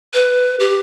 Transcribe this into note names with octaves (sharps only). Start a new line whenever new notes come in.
B4
G4